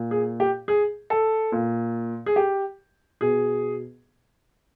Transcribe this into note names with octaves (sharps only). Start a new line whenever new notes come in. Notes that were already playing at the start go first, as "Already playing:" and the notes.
Already playing: A#2
G#4
G4
G#4
A4
A#2
G#4
G4
B2 G#4